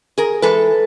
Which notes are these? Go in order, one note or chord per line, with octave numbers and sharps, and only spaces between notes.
G#4 A#4
E3 G#3 A4 B4